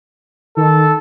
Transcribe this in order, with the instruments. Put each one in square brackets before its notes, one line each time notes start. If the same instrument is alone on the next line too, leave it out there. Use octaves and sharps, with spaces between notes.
[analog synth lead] D#3 [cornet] A4